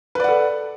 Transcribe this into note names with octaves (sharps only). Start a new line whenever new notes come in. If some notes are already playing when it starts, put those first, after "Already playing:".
A4 B4 D5 F#5